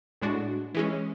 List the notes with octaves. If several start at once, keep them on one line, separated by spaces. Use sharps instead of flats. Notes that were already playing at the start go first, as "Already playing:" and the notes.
A2 G#3 D4 F#4
E3 G#3 C#4